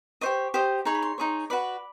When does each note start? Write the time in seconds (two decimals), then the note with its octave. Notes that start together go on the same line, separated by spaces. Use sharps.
0.21 G4 C5 D#5 C#6
0.54 G4 C5 D#5
0.85 D#4 G#4 C#5 C6
0.95 B5
1.02 C6
1.18 D#4 G#4 C#5
1.50 F#4 B4 D5 B5